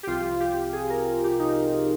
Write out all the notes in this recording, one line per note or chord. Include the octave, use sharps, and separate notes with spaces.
G4
C2 C3 F3 F4
G4
G#4
A#4
G4
D#4